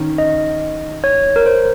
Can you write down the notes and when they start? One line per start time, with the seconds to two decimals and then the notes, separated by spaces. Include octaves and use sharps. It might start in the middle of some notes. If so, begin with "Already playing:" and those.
Already playing: D#3 C#4
0.18 D#5
1.04 C#5
1.36 A#4
1.46 C5